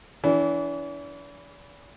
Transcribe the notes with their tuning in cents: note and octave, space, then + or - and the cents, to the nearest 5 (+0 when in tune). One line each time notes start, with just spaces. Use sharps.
E3 +0 D4 -45